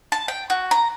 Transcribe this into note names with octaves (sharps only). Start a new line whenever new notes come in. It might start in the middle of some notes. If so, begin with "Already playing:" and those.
A5
G5
F#4
A#5